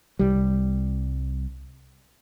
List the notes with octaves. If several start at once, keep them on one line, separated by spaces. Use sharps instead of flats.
C2 G3